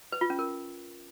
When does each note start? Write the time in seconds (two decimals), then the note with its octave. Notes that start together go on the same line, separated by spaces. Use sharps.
0.12 B4
0.21 F4
0.30 C#4
0.39 A#4